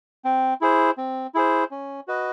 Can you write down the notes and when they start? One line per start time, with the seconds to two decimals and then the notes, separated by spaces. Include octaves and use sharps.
0.25 C4
0.61 E4 G#4 C5
0.98 C4
1.34 E4 G#4 C5
1.71 C#4
2.08 F#4 B4 D#5